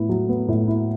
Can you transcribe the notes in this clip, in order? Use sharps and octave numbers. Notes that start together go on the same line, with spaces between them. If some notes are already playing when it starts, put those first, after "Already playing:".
Already playing: A2 B3 E4
F#3
B3
A2
E4